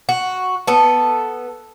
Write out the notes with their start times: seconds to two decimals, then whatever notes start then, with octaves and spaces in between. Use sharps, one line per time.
0.09 F#4
0.67 B3 A4